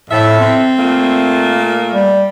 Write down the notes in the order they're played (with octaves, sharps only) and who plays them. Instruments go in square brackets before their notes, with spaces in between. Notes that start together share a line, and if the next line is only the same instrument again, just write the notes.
[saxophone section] F2 A4 E5 [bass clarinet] A2
[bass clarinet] C4
[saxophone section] A#2 A3 A#3
[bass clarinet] G3